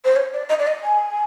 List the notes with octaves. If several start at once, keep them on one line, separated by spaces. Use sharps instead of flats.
C5
C#5
D5
D#5
D5
D#5
G#5